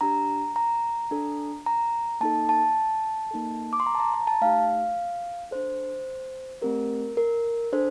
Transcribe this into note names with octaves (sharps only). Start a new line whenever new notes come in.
D4 G4 A#5
A#5
D4 A4
A#5
A#3 D#4 A4 A5
A5
A#3 D#4 A4
D6
C6
A#5
A5
A#5
A#5
A5
A3 D#4 G4 F5
D4 A4 C5
A3 C4 G4 A#4
A#4
D4 A4 C5